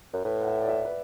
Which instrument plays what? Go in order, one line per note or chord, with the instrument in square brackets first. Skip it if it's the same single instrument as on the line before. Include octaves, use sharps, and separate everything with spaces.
[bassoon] F#2
[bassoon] A2 [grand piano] B4
[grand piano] F#5
E5
D5
E5
B4